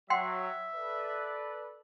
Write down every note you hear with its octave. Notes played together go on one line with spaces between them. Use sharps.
F#3 E5 F#5 G5 C6
A4 B4 D5